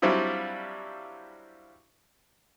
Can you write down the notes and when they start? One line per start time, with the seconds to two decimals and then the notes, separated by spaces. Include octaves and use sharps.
0.02 F#3 G3 C4 D4 E4 F4